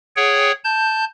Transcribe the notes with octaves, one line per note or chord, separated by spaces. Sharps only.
G#4 C#5 F#5 G5
A5 G6